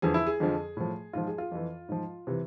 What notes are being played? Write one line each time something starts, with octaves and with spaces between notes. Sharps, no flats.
E2 D3 F3 G#4
E4
G#4
F2 D3 F3
A2 F3
G#2 F3 F4
G#4
F4
F2 E3
G#2 F3
C3 E3